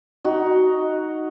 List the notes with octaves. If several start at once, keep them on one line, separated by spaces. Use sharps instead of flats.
D#4 F#4